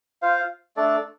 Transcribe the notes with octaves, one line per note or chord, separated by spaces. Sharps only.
F4 C5 F5
A3 D4 A4 D5